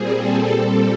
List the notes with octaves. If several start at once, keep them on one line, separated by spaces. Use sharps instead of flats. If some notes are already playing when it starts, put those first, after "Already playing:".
Already playing: A#2 G3 C4 G#4
A4
A#2 G3 C4